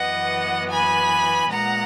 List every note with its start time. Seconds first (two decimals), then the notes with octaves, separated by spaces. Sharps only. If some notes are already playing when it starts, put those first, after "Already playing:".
Already playing: F#2 E3 B3 D#5 F#5
0.71 G#5 B5
1.50 A#2 G#3 B3 F#5 A#5